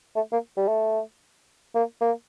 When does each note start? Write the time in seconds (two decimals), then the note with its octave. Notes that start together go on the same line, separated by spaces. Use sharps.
0.16 A3
0.32 A#3
0.57 G3
0.68 A3
1.75 A#3
2.01 A#3